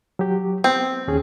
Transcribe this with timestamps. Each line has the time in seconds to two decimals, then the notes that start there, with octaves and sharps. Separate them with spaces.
0.19 F#3 G4
0.64 B3 C4
1.08 D#2 C#4 G#4